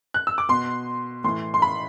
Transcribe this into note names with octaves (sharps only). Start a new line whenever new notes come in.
F#6
E6
D6
B2 C6
A2 E3 C6
C6
B5